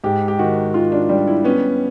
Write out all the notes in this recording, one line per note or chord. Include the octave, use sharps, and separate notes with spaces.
G#2 G4
G4
D#3 F#4
D#3 F4
D4
G3 D4
E4
B3 C#4